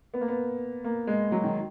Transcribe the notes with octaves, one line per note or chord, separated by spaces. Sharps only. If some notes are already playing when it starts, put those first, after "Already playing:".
B3
A#3
B3
A#3
G#3
F#3
D#3